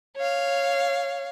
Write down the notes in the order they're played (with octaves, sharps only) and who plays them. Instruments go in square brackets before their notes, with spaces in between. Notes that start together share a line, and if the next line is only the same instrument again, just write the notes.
[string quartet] C#5 F5